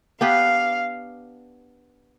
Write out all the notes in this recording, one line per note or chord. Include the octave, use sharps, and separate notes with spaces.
B3 D4 G4 B4 F5